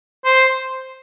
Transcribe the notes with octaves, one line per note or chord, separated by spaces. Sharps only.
C5